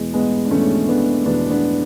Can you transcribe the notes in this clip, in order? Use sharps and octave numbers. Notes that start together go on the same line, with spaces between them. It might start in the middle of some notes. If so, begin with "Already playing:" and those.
Already playing: E2 B2 G#3
G#3 B3
D4
E2 B2 A3 C#4
B3 D4
E2 B2 B3 D4
B3 D4